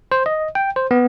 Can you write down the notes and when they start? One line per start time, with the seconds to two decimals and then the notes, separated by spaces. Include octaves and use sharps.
0.12 C5
0.26 D#5
0.55 G5
0.76 C5
0.91 B3